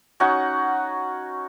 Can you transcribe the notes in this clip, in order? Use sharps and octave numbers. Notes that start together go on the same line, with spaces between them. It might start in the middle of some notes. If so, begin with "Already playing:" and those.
C#4 D#4 F#4 F#5